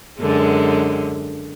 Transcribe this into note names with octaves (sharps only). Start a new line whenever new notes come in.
F#2 D3 G#3